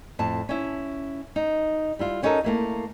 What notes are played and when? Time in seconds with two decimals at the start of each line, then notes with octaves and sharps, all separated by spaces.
0.19 F2 A2 A5
0.49 C#4 E4
1.36 D#4
1.99 G3 E4 F4
2.22 B3 C#4 D#4 F#4 A4 A#4
2.44 A3 A#3 E4